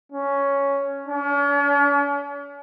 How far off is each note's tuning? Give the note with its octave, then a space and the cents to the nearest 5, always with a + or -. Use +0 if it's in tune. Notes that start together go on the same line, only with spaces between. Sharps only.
C#4 +5
C#4 +45